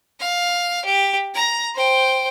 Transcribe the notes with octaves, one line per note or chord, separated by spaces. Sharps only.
F5
G4
A#5
C5 G5